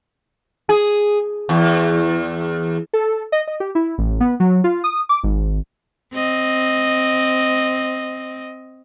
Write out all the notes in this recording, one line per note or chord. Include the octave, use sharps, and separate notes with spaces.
G#4
E2
A4
D#5
D#5
G4
E4
A1
B3
F#3
F4
D#6
D6
G#1
C4 D#5